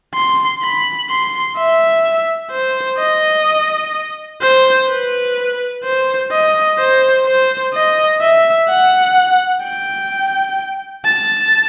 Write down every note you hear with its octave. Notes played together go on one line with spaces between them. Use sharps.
C6
B5
C6
E5
C5
D#5
C5
B4
C5
D#5
C5
C5
D#5
E5
F#5
G5
A5